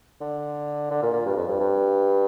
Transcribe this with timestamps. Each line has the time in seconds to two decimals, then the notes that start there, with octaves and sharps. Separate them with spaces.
0.21 D3
0.91 D3
1.02 A#2
1.13 A#2
1.26 G2
1.37 F2
1.48 G2
1.60 G2